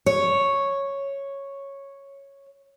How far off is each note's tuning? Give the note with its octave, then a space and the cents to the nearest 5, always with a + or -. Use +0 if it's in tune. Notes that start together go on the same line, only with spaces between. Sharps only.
C#5 -5